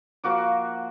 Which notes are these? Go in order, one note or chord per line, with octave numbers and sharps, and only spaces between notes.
F3 A#3 F#4 D6